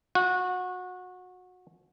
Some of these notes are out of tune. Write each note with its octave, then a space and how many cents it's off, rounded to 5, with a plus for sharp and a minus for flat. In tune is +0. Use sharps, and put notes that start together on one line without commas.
F#4 -25